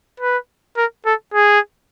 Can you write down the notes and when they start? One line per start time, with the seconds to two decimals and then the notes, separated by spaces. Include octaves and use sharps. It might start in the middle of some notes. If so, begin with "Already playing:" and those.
0.20 B4
0.77 A#4
1.06 A4
1.34 G#4